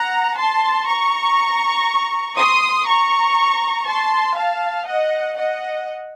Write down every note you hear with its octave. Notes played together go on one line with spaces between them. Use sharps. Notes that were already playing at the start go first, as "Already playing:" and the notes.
Already playing: F#5 A#5
A5 C6
A#5 C#6
C6 D#6
A#5 C#6
A5 C6
F5 A5
D#5 F#5
D#5 F#5